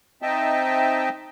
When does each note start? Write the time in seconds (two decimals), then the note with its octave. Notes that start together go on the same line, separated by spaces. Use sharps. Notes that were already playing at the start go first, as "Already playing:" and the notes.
0.22 C4 D#4 D#5 E5 G5 A5